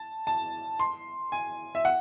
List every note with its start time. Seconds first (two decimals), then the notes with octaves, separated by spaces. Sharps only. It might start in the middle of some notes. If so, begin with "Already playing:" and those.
Already playing: A5
0.27 A5
0.80 C6
1.32 G#5
1.75 E5
1.85 F#5